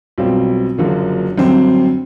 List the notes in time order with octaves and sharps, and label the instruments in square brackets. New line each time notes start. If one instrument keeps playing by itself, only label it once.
[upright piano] B1 B2 G3 C4 F4
F#1 F#2 D3 F3 A#3
F#2 D3 G3 C4